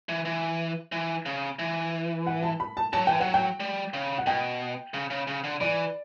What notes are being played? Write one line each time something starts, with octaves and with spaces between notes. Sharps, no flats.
E3
E3
E3
C#3
E3
F#5
A5
B5
A5
F#3 A5
E3 G5
F#3 F#5
G5
G3
C#3
F#5
B2 G5
C#3
C#3
C#3
D3
E3 D5